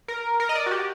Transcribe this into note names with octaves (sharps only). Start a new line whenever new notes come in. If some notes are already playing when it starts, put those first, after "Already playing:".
A#4
A#4
D#5
D5
F#4
G4